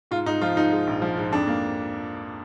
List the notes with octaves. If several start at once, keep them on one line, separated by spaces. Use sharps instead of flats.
G#2 F4
G#2 D#4
F3 F4
G#2 D#4
G#3
A#1
F3
G#2
F2 D4
A#3